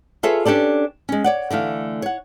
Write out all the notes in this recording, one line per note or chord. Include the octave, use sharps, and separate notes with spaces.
F4 G#4 A4 B4 C#5 E5
C#4 D4 G4 A4 D5
G#3 C#4
C#5 D5 F#5
D3 E3 A3 F5
C#5 F#5